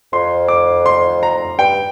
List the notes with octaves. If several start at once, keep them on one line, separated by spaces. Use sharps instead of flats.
F2 C6
D6
C6
A#5
G2 G5